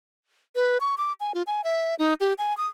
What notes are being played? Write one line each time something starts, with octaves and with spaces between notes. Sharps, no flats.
B4
C#6
D6
G#5
F4
G#5
E5
D#4
G4
G#5
D#6